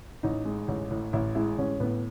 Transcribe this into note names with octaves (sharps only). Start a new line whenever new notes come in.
A1 D#4
G#3
A1
A2
A1 E4
G#3 E4
A1 C#4
A2 B3